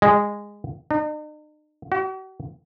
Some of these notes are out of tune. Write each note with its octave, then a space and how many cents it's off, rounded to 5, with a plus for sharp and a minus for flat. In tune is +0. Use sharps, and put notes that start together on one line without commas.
G#3 -15
D#4 -45
F#4 +45